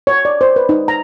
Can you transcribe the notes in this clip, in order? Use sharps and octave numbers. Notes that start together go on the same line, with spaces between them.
C#5
D5
C5
B4
D#4
A#5